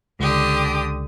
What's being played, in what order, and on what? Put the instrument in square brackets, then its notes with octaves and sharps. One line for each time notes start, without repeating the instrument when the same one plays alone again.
[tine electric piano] C#2 [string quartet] D3 G4 D#6